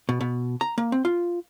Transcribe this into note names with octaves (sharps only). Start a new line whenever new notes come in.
B2
B2
A#5
A#3
C4
F4